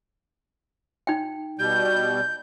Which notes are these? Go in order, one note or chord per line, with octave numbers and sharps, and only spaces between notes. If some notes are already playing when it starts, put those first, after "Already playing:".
D#4 G5
B2 G3 G6